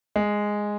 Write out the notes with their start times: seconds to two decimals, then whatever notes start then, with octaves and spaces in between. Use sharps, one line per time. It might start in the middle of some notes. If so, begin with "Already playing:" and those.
0.16 G#3